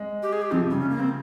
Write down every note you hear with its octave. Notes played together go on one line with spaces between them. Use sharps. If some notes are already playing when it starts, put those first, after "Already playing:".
Already playing: G#3
G4
G#4
G4
F3 C4
C3
C#3 G3
C#4
A#3
C4